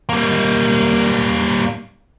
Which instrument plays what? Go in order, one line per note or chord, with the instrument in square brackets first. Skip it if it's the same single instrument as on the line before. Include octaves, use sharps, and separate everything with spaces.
[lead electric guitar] G3 A#3